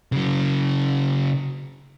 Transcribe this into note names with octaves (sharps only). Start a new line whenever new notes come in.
C#3 F#3